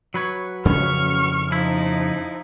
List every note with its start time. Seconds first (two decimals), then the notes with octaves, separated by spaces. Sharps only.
0.14 F#3 B4 C#5
0.65 F2 C#3 C#4 C#6 F6
1.52 F3 D#4 E4